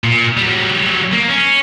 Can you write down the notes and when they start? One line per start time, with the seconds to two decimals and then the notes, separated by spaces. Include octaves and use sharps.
0.04 A#2
0.37 F#3 G3
1.13 A#3
1.28 C#4